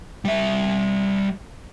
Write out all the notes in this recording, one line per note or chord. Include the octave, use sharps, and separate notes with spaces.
G3 E5